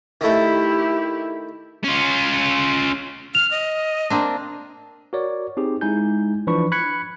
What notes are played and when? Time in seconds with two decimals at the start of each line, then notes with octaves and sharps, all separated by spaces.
0.21 D#3 A3 E4 G4
1.84 C#4 F4
3.35 F6 F7
3.51 D#5
4.10 A#3 C4 D4
5.13 F#4 A#4 C#5 D5
5.57 C4 D#4 G4 G#4
5.81 G#3 D#4 E4 G#5 G6
6.47 E3 F3 D4 B4 B5 C#6
6.72 B5 F#6 G#6 C#7